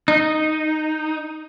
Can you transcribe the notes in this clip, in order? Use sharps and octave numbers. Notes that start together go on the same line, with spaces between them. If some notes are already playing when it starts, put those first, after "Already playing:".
D#4